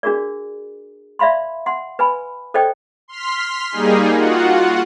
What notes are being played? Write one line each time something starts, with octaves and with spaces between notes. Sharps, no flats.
D4 F#4 G#4 A#4 D5
D5 E5 F5 B5 C6
F#5 C6
B4 G#5 B5
A4 C5 D5 D#5 G5
C6 F6 B6
G3 A#3 D#4 G#4
F4 F#4 F#5